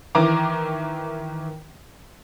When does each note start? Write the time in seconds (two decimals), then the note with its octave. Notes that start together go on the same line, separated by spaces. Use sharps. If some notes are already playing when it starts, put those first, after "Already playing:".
0.15 D#3 E3 A#5 D6